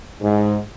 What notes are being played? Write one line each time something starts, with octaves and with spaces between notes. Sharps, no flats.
G#2